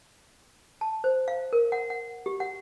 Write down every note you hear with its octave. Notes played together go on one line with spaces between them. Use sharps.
A5
C5
F5
A#4
F#5
F#5
G4
F#5